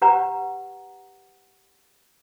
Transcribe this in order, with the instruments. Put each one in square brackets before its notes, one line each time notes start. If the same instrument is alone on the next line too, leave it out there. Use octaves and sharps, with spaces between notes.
[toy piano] G4 B4 F#5 A#5